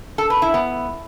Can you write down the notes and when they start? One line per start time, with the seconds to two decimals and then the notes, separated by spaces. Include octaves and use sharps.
0.18 A4
0.30 B4
0.42 E4
0.54 B3